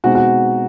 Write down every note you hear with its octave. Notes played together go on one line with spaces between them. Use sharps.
B2 G#3 C4 D#4 F#4
F#4